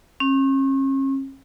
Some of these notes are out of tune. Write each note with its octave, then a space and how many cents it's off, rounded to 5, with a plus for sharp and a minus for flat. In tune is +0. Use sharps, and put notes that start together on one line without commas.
C#4 -40